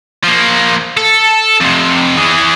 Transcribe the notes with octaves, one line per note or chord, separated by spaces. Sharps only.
F3 A#3
A4
F2 C3
E3 G#4